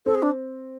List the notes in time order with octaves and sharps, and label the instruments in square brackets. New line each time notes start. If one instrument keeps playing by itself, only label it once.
[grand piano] C4 [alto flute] A4
[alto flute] G#4
D4